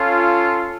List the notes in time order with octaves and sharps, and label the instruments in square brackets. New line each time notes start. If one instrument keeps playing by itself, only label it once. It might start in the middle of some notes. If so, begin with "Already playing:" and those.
Already playing: [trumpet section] C#4 F4 A4